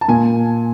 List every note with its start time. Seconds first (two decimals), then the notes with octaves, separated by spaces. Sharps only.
0.01 A5
0.08 A#2 G#5